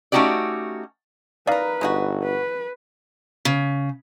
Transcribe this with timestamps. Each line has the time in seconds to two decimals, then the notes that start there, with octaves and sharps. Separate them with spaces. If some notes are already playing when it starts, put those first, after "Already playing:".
0.12 A3 C#4 D#4 F#4 G4 D5
1.47 D#4 A#4 B4 D5 F5
1.81 G1 G#3 D#4 F#4
2.24 B4
3.45 C#3